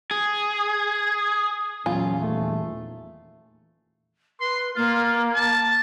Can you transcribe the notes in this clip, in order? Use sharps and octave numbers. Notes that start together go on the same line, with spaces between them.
G#4
E2 A#2 F#3 C#4 F4 G#5
D#1 A3
B4 C6
A#3 F4
A5